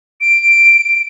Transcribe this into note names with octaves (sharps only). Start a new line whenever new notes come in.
D7